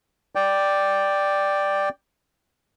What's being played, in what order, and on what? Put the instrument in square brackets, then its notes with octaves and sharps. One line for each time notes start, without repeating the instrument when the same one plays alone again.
[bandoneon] D5 G5